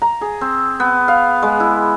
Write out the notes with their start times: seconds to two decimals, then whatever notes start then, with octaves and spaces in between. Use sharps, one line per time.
0.02 A#5
0.21 G#4
0.41 C4
0.80 B3
1.08 F5
1.42 G#3
1.60 E4